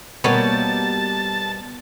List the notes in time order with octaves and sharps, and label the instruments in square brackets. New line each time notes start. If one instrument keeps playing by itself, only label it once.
[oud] B2 G3 A#3 [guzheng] B3 C#5 [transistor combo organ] A5